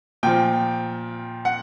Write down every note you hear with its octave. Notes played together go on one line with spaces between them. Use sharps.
A#2 F3 G5
F#5